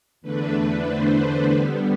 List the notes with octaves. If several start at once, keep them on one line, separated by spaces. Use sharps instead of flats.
E2 D3 A3 D4 B4
C5
D3 G3 B3 B4